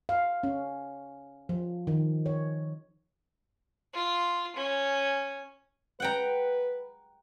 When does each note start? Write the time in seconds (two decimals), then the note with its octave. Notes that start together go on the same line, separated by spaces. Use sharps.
0.09 F5
0.43 C#4
1.49 F3
1.87 D#3
2.26 C#5
3.93 F4
4.56 C#4
6.00 B4 F#5 G5 A#5